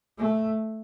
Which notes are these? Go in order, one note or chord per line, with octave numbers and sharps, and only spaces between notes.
A3